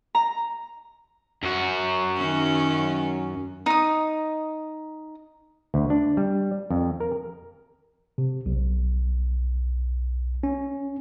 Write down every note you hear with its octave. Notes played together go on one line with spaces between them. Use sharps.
A#5
F#2 F#4
D#3 C#4
D#4 D#6
D2
D4
G3
F2
A#4
C3
B1
C#4